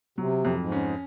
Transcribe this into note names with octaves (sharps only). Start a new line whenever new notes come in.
C3 F#3
F2
G#2
C#4